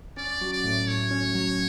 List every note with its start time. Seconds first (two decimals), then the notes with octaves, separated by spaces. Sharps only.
0.17 C#4 D5
0.41 F#3
0.52 D5
0.64 A2
0.88 A2 C#5
1.11 C#4
1.35 F#3